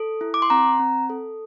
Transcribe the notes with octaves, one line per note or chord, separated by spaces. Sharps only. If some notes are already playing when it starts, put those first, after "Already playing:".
Already playing: A4
E4
D6
C6
C4 A#5
C4
A4